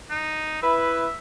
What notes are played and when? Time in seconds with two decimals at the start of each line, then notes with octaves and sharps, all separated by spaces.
0.10 D#4
0.63 E4 B4 E5